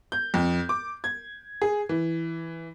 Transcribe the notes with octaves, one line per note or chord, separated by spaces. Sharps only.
G6
F2
D6
G#6
G#4
E3